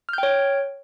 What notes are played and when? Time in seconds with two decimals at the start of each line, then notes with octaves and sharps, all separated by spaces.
0.09 F6
0.13 G6
0.18 G5
0.23 C#5